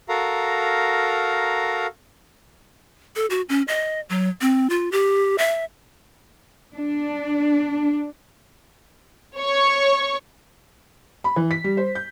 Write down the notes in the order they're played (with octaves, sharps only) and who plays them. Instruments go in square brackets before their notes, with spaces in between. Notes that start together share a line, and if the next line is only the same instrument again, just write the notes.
[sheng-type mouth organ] F#4 A4 A#4 F5 A#5
[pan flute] A4
F#4
C#4
D#5
F#3
C4
F4
G4
E5
[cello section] D4
[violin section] C#5 C#6
[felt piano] B5
E3
B6
G3
C5
G6